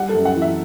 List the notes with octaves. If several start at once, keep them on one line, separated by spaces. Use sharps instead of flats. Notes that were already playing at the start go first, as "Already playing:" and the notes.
Already playing: G3 F#5
A4
F#2
F#5
E3
E5